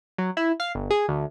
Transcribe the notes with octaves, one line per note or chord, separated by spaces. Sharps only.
F#3
E4
F5
G1
G#4
D2